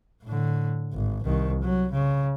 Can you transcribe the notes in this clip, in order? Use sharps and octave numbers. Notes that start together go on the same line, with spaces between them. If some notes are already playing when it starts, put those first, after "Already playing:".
A2 D3
G#1
C2 D#3
F#3
C#3